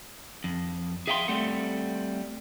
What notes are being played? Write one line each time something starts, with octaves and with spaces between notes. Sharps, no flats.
F2
G#4 E5 F5 G5 A#5 C6
G3 A3 C4 A4 F#5